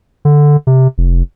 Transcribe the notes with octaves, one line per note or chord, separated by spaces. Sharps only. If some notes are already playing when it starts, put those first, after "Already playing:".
D3
C3
F1